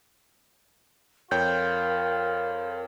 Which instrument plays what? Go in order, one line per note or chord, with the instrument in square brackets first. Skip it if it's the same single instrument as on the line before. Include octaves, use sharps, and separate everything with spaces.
[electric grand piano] F2 C#5 G5 [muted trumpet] F4 [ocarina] A#4 [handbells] G6